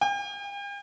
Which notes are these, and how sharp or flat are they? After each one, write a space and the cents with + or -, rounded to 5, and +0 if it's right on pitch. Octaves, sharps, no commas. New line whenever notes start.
G5 +45